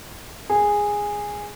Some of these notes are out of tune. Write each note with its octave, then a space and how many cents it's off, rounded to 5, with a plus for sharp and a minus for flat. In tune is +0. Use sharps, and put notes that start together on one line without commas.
G#4 -10